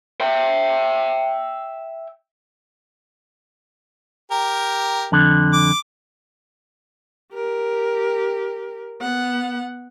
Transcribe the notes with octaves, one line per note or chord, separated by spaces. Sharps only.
E5 G5
G4 A#4
F2 D3
D6
G4 A#4
B3 F#5